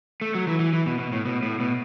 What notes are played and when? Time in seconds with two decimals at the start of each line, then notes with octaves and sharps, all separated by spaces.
0.21 A3
0.35 F#3
0.47 E3
0.60 E3
0.73 E3
0.86 B2
0.99 B2
1.12 A2
1.25 B2
1.43 A2
1.60 B2